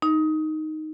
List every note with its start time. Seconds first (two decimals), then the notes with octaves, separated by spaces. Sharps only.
0.02 D#4